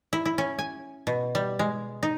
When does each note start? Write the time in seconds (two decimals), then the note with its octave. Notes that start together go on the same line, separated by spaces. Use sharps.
0.13 E4
0.25 E4
0.38 C#4
0.59 G#5
1.07 B2
1.35 G3
1.59 G#3
2.03 D#4